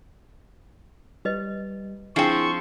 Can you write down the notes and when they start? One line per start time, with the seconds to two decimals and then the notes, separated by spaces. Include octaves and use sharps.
1.25 G3 G4 B4 D#5
2.16 F3 C4 D4 E4 G#4 E5 G5 C#6